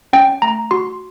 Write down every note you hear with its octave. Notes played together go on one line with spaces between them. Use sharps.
C#4 G5
A3 A#5
F#4 C6